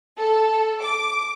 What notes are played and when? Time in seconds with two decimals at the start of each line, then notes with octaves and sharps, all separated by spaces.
0.18 A4
0.81 D6